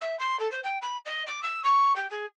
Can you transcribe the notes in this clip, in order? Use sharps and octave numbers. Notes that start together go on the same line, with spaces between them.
E5
C6
A4
C5
G5
B5
D#5
D6
E6
C#6
G4
G#4